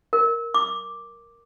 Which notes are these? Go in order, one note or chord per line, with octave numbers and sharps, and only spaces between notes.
A#4
D6